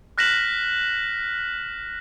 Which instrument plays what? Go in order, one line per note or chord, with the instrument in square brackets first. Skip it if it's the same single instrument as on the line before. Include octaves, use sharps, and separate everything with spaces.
[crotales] F6 F#6 A#6 B6 E7 F#7